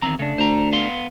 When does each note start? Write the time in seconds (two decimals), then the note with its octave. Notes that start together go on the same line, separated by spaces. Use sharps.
0.02 E2 D#3 C4 A#5
0.19 C#3 A3 D4
0.38 D2 C5 A#5
0.73 B3 F5 C6